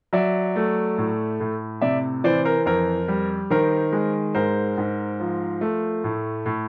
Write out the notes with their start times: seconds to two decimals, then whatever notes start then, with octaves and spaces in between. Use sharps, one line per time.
0.13 F#3 D5 E5
0.56 A3
0.98 A2
1.40 A2
1.81 C3 D5 E5
2.24 E3 C5 D5
2.45 A#4 C5
2.66 F2 A#4 C5
3.08 G3
3.50 D#3 A#4 C5
3.92 G#3
4.35 G#2 A#4 C5
4.78 G#2
5.20 F3
5.61 A3
6.04 A2
6.46 A2